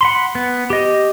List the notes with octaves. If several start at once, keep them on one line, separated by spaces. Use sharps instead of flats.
F#5 B5 C6
B3
G4 D#5